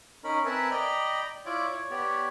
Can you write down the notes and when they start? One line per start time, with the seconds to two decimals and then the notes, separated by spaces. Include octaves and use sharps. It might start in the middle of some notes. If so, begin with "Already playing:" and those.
0.24 C#4 D#4 A#4 B5
0.46 C4 A#4 B4 E5 G#5 A5
0.71 D5 D#5 G5 A#5 B5
1.46 E4 F4 C#5 D5 D6
1.72 C#5
1.91 B3 G4 C#5 D5